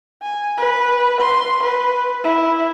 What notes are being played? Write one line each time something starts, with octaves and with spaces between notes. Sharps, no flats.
G#5
B4
C6
B4
E4